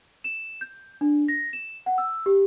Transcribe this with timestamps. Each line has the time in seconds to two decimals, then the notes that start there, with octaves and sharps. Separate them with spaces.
0.24 E7
0.61 G6
1.01 D4
1.28 A#6
1.53 E7
1.86 F#5
1.98 E6
2.26 G4